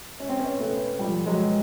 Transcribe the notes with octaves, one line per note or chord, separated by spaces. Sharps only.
C#4
C4
B3 C#4
A3 B3
F3 G3
F#3 G#3